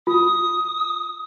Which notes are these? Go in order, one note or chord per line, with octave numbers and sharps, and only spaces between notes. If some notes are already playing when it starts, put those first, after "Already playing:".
F4 D#6